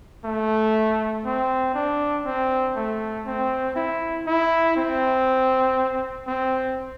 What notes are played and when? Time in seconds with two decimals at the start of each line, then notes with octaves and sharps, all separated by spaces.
0.25 A3
1.25 C4
1.75 D4
2.25 C4
2.76 A3
3.26 C4
3.76 E4
4.27 E4
4.76 C4
6.28 C4